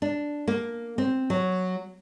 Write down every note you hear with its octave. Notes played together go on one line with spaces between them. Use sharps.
D4
A#3
C4
F#3